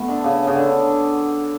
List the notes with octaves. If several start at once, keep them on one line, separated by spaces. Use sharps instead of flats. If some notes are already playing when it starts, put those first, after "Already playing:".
Already playing: A3 B3
D3
C#3
C#3
D3